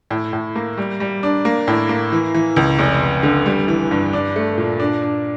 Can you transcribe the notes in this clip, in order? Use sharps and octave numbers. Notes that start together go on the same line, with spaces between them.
A2
A2
A#3
G3
G3
D4
A#3
A2
A#3
E3
E3
C#2
F1
F1
D3
G3
E3
G2
D4
A3
A#2
D4
D4